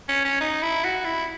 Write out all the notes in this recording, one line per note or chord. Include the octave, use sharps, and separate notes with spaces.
C#4
C#4
D#4
E4
F#4
E4